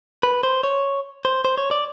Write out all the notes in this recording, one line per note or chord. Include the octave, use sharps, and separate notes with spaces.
B4
C5
C#5
C5
C5
C#5
D5